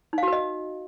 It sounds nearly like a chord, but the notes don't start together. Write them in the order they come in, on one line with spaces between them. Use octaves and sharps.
D#4 F5 F#4 B4 D#5